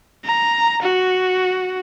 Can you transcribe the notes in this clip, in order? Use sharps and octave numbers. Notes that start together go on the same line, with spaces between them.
A#5
F#4